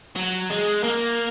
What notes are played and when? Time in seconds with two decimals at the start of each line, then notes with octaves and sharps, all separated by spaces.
0.16 F#3
0.50 G#3
0.84 A#3